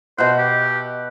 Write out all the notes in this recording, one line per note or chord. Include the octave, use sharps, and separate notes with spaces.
B2 C5 E5 F#5
G4